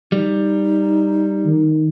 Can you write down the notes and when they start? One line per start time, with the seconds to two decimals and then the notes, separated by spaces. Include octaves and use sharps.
0.12 G3 D#4
1.46 D#3